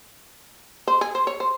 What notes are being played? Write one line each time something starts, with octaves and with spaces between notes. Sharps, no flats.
C5
G#4
C5
C#5
C5